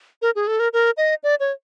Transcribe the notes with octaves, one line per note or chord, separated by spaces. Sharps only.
A#4
G#4
A4
A#4
A#4
D#5
D5
C#5